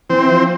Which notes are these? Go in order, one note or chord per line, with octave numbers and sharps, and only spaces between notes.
E3 C4
F3